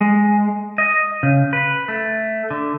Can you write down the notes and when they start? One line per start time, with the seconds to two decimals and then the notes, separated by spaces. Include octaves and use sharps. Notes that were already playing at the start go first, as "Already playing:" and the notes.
0.01 G#3
0.78 D#5
1.23 C#3
1.53 B4
1.88 A3
2.51 D3